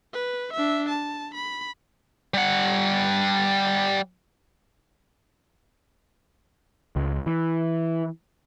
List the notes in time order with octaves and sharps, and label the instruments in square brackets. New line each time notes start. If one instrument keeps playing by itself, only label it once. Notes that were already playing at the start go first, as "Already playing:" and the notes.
[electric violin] B4
D4 E5
A5
B5
[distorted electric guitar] G3 F#5
[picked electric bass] C#2
E3